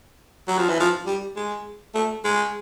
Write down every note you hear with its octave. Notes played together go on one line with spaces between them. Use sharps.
F#3
F3
E3
F3
G3
G#3
A3
G#3